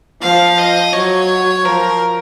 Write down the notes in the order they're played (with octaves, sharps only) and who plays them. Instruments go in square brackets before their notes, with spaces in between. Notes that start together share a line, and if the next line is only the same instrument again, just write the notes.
[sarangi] F3 [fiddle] F5
[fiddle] D#5
[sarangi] F#3 [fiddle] C#5
[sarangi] F3 [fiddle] A#4